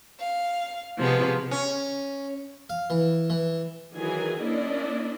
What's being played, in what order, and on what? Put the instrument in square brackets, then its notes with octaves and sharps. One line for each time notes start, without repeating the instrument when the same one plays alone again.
[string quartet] F5
C3 F3 G#3 B3
[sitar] C#4
[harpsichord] F5
E3
E3
[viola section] D#3 E3 F#3 G#4 G#5
A#3 C#4 D4 E4 D5 D#5